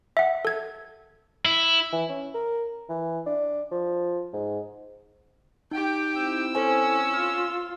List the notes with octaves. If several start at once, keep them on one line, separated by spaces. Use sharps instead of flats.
E5 F#5
A4 G#6
E4
E3
C#4
A#4
E3
D4
F3
G#2
D#4 G4 G5
C4 E4 E6
C#4 A4 C5 G#5
F4 F6